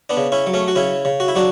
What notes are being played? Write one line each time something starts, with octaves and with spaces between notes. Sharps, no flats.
B3 D4
C#3
C#4 E4
F#3
A3 C#4
F#4
C#3 C#4 E4
C#3
F#4
E4
F#3 D4 F#4